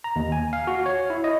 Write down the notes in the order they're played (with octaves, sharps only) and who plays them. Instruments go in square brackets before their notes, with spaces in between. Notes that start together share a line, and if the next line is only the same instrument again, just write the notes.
[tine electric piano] A#5
D#2
G#5
F5
F#4
C#5
E4
D#5